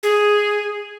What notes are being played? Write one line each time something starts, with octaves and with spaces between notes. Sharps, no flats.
G#4